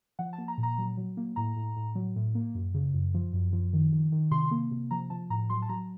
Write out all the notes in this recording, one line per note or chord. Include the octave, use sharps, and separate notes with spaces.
F3 F#5
A5
A#3
A#5
A#2
A#5
F#3
F#3
A#3
A2 A#5
A2
A2
F#3
A2
A#3
F#2
C#3
F#2
F3
F#2
F3
D#3
D#3
D#3
C3 C6
A#3
C3
F3 A#5
F3 A5
A2 A#5
F#3 C6
A5
F#3 A#5